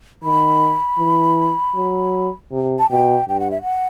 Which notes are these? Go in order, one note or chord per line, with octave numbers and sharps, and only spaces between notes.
D#3 B5
E3
F#3
C3
A5
B2 G5
G2 G5
F#5
E5
F#5